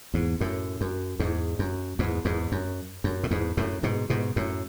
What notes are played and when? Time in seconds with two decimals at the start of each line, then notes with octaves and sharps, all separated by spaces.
0.14 E2 G#2
0.41 F#2 A2
0.81 F#2
1.19 E2 G#2
1.59 F#2
1.99 E2 G#2
2.25 E2 G#2
2.52 F#2
3.04 F#2
3.24 A2
3.31 E2 G#2
3.57 F#2 A2
3.83 G#2 B2
4.10 G#2 B2
4.36 F#2 A2